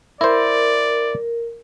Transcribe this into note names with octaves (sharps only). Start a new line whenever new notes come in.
E4 A#4 C5 D5